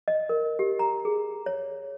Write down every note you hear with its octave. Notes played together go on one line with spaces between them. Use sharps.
D#5
A#4
G4
A#5
G#4
C#5